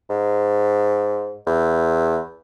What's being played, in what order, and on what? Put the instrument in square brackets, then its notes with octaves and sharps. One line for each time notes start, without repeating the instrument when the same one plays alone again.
[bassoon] G#2
E2